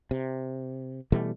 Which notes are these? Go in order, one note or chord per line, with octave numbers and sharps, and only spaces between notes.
C3
B2 E3 G3 A3